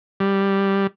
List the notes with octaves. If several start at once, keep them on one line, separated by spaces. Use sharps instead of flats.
G3